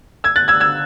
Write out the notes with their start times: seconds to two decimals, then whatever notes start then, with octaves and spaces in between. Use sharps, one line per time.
0.24 E6 G#6
0.36 F#6 A6
0.48 E6 G#6
0.60 E6 G#6